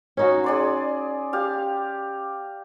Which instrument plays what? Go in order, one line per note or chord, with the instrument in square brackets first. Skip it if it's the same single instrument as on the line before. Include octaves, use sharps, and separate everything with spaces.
[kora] C#4 D#4 F#4
[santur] G#4 D5 C6
G4 F5